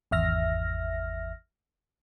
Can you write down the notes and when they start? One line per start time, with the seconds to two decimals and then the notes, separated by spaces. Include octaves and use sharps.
0.11 G#1 E2 E5 F6 A#6